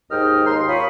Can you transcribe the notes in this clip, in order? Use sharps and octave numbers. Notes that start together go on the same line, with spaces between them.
D#2 G#2 D#5 G5 F6
D#2 A#5 C6
F4 C#5 B5 C#6 D#6